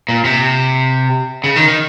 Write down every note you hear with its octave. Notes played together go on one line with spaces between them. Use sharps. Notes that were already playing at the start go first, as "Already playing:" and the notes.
A#2
C3
C#3
D#3
D#3